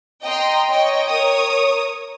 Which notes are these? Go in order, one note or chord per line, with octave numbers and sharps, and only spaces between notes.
D#5 G5 A#5 C6
C#5 D#5 G5
A#4 C#5 D#6